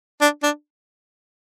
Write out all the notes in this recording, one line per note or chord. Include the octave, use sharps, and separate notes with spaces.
D4
D4